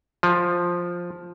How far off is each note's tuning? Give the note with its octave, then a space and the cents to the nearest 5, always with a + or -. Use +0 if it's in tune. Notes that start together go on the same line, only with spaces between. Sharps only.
F3 +5